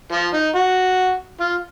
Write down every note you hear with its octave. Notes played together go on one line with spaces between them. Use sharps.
F3
D#4
F#4
F4